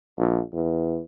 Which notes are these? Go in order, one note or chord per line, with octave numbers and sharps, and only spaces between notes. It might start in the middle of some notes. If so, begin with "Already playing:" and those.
A#1
E2